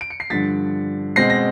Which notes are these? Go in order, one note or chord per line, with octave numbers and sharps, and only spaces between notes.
D7
C#7
C7
G2 D3 F3 A6 B6
B2 G#3 C4 A#6 C7
A#6